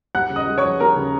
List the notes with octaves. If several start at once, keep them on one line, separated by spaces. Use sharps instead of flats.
D#2 F#5 F#6
C#3
D#5 D#6
G#3
C#5 C#6
F3
D#2 A#4 A#5
C#3